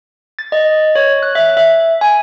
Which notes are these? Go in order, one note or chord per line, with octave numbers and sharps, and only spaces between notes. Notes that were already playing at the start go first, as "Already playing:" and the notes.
A6
D#5
C#5
F#6
E5
E5
G#5